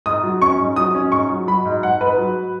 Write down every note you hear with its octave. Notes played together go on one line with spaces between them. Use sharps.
G#2 D#6
F#3
C#4 C#6
G#2
F#3 D#6
C#4
G#2 C#6
F#3
F#3 B5
G#2
G#2 F#5
G#2 B4
F#3